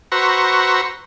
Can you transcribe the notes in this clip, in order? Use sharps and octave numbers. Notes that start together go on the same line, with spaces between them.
F#4 B4 C5 A#5 C#6 E6